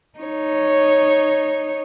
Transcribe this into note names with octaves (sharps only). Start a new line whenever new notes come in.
D#4 C#5